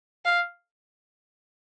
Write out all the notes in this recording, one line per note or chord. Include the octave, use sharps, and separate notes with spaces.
F5